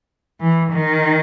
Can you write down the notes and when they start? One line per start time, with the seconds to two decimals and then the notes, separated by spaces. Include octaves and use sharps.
0.40 E3
0.72 D#3